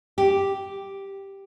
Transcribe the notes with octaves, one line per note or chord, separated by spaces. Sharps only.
G4